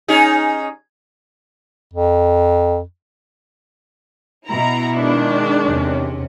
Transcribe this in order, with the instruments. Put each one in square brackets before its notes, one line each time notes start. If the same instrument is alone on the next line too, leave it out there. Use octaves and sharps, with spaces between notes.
[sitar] C#4 D#4 G#4
[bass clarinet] F2
[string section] B2 E4 [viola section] A#5
[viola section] D#3 G#3 D4
[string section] E2 C3 C#4